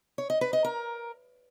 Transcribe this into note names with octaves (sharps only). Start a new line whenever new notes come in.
C#5
D#5
B4
D#5
A#4